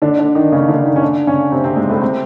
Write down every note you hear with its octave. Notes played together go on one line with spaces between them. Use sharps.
D3 D4
D3 D4
D#3 D#4
C#3 C#4
D3 D4
D#3 D#4
C#4
D3 D4
C#3 C#4
C3 C4
C3 C4
G#2 G#3
A2 A3
C3 C4